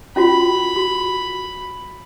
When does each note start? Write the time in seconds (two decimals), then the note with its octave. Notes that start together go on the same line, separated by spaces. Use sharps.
0.16 C#4 F4 F#4 B5
0.76 F#4